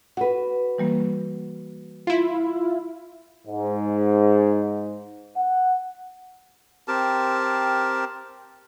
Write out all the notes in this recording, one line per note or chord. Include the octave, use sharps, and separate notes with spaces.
F#4 B4 F#5
E3 G3 A#3
E4 F4
G#2
F#5
C4 G4 A#4 A5